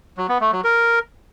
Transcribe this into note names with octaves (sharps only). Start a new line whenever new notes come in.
F#3
B3
A3
F#3
A#4